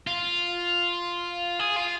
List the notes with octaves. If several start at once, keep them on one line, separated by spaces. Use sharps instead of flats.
F4
G#4
F4